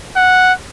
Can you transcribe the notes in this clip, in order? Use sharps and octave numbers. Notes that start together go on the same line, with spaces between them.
F#5